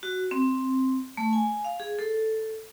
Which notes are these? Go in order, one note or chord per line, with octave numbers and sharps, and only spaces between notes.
F#4
C4
A3
G#5
F5
G#4
A4